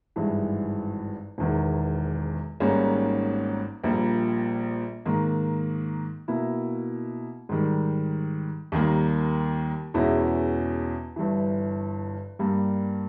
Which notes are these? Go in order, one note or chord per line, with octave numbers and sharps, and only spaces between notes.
G#1 G2 E3 G#3
E1 E2 D#3
G#1 G#2 G3 A#3 C#4
A#1 A#2 G3 A#3
G#2 D#3 A#3
B2 A#3 E4
G#2 D#3 G3
D#2 D#3 G3 A#3
E2 B2 G#3 C#4 E4
G1 G2 E3
G2 G3 A#3